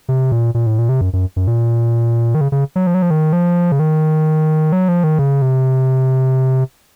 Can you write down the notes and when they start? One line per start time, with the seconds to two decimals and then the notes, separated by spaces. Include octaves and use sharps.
0.09 C3
0.32 A#2
0.55 A#2
0.66 A2
0.79 A#2
0.89 C3
1.01 F#2
1.13 F#2
1.36 F#2
1.47 A#2
2.35 D#3
2.41 C#3
2.52 C#3
2.76 F#3
2.87 F3
2.94 F#3
3.02 F3
3.11 D#3
3.33 F3
3.72 C#3
3.79 D#3
4.72 F#3
4.88 F3
5.04 D#3
5.19 C#3
5.42 C3